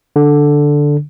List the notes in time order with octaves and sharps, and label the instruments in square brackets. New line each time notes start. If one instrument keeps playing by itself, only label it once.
[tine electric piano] D3